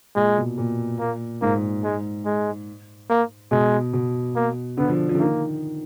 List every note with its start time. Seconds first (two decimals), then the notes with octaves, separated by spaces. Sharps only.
0.16 A#2 G#3
0.37 B2
0.58 A#2
0.99 A#3
1.42 G#2 A#3
1.84 G#3
2.25 G#3
3.10 A#3
3.51 B2 G#3
3.93 B2
4.36 A#3
4.77 D3 B3
4.88 F3
5.09 F3
5.15 D3
5.20 D#3 A#3